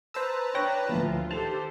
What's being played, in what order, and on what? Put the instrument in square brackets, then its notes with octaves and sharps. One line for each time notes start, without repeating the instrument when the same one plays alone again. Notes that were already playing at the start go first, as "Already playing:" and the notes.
[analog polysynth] B4 A5 A#5 [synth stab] C5 E6
[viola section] D4 [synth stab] C#5 G5 A#6 [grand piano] F#6
[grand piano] D2 A2 F3 [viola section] F4
[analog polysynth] D#3 [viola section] G4 A4 C5 [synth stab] A5 [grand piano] F7